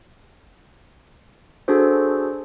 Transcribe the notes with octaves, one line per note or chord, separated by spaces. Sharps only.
D4 F#4 G#4 A4 C5